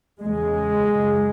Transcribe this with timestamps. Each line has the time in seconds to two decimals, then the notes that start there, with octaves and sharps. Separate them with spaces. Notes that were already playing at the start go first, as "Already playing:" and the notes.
0.21 E2 C#3 G#3
0.91 F#2 C#3